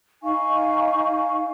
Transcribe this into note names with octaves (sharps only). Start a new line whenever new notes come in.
D#4 F5 G#5 C#6